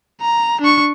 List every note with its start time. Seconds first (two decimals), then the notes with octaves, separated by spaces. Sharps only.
0.21 A#5
0.61 D4 C#6